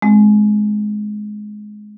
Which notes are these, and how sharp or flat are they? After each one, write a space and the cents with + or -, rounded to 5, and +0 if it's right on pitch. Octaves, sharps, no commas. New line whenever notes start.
G#3 +15 C4 +10